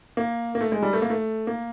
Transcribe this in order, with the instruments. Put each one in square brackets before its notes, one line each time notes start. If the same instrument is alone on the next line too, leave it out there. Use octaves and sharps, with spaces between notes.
[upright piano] A#3
A#3
A3
G#3
G3
A3
A#3
A3
A#3